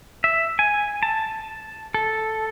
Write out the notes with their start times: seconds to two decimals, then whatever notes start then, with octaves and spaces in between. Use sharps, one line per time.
0.24 E5
0.59 G#5
1.03 A5
1.94 A4